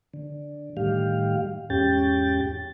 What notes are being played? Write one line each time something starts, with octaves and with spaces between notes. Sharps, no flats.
D3
A2 D#3 G3 G4 F5
E2 G#2 C#4 G4 G5 A6